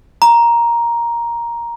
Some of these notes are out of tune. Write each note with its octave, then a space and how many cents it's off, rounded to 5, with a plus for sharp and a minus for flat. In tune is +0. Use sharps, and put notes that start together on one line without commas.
A#5 +5